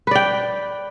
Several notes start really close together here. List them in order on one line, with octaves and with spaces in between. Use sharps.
B4 D5 G5